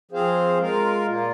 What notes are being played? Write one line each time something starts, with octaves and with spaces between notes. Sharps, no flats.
F3 C4 G#4 C5 F5
G#3 F4 A#4 F5
A#2 A#3 F4